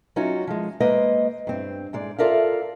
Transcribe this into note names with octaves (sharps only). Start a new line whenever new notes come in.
F#3 C#4 D#4 F4 F#4
F3 G#3
G#3 A#3 B4 C5 D#5
G2 C4
G#2 G#3 D5
F4 A4 A#4 D5 E5 F5